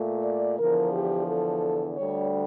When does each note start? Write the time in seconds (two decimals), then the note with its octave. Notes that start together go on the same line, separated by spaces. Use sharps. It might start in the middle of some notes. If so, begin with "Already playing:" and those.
Already playing: A#2 A3
0.25 D5
0.58 E2 D3 F3 A#4
0.94 G4
1.28 A4
1.97 D2 D3 G3 C#5